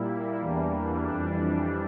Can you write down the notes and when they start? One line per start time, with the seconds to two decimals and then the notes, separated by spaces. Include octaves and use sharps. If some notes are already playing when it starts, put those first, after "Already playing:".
Already playing: A#2 G3 A#3 E4
0.41 E2 E3 G3 A#3 D4
1.05 F2 E3 G3 D4